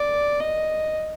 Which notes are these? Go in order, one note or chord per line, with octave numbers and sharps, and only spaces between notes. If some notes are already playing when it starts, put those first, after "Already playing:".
Already playing: D5
D#5